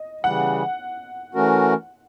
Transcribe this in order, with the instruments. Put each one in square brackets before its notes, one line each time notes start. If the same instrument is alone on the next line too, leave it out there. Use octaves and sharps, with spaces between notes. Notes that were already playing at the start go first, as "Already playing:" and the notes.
Already playing: [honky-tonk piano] D#5
[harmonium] C#3 E3 G3 [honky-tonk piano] F#5
[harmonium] E3 A3 C#4 F#4 A#4